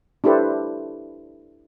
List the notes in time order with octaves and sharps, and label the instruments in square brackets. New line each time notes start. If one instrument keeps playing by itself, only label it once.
[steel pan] D4 E4 G4 A4 B4 C5